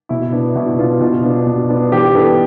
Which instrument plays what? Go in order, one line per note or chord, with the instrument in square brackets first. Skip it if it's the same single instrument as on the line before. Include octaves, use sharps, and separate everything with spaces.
[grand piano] B2 E4
B3 D4
B2 E4
B3 D4 F4
B2 F4
B3 D4
B2
B3 D4
E3 G4
B3 D4 A4